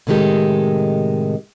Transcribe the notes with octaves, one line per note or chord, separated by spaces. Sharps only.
A2 C3 D#3 G#3 G4 A4